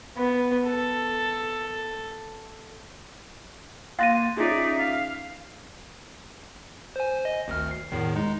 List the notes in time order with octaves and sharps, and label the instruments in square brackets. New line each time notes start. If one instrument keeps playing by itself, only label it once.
[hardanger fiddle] B3
A4
[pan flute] A#3 [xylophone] F5 A#6 D#7 [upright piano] C6 F#6 A6
[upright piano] C#4 F4 G#4 [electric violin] D#4 D5 [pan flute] E5
[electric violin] F5
[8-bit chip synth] C5 G#5
D#5
G#1 D2 F6
C7
E2 A2 D#3
G#3 D#4